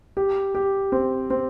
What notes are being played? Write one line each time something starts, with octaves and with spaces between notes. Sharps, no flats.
G4
G4
C4
C4